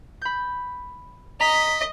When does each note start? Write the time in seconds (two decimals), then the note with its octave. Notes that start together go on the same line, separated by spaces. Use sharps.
0.22 B5 G6
1.41 D#5 A#5 B6